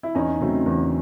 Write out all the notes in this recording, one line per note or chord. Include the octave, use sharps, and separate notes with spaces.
E4
E2 C#4 D#4
C#3 F#3 A3 C4
E2